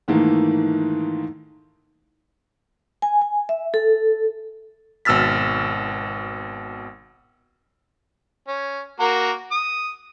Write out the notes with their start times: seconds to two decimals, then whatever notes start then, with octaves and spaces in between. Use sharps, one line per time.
0.08 G#2 D#3 E3 A3 A#3
3.02 G#5
3.22 G#5
3.49 E5
3.74 A4
5.05 G#1 B2 E6 F6 A6 B6
8.48 C#4
9.00 A#3 F#4 A#4
9.51 D#6